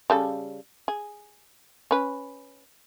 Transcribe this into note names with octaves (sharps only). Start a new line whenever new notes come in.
C#3 G3 A4
G#4
C#4 B4